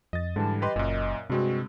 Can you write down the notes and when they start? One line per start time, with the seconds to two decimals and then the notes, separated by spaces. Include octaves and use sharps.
0.13 F2 D#5 A6
0.36 G#2 D3 E3 G3 A5
0.62 G4 B4 D#5 C6
0.76 F#1 F#2 A#2
1.30 G2 C3 G#3 C4 F#4